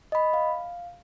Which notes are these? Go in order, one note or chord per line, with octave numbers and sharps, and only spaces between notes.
D#5 B5
F5